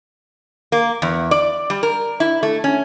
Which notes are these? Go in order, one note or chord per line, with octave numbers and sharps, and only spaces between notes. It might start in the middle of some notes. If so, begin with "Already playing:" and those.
A#3
E2
D5
G3
A#4
E4
A3
C#4